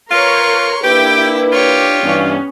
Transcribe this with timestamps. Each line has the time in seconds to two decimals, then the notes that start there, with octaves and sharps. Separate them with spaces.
0.11 F4 A#4 B4 C#5 C6 C#6
0.84 A#3 D4 E4 G4 B4 G5 D6
1.53 F4 G4 C#5
2.03 G2 E3 B3 C#4